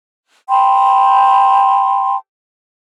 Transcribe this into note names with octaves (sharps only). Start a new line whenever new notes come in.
G5 A5 B5 C6